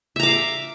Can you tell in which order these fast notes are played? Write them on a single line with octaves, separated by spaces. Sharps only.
E5 A#5 D6 F5